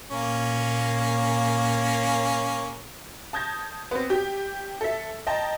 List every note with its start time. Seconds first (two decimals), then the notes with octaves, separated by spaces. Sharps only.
0.11 A#2 A#3 C#4
3.33 A5 D#6 G6 G#6 A#6
3.91 B3 C4
4.10 G4
4.81 A4 E5
5.27 D#5 G5 A5 A#5